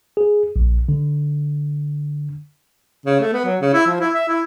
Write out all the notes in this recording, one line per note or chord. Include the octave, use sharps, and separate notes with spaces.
G#4
A#1
D3
C#3
A3
B3
F#3
C#3
E4
F3
E4
E5
E4